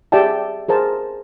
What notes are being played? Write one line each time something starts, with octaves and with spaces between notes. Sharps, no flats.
G4 G#4 D5 E5 G5 A5
G#4 A#4 C5 A5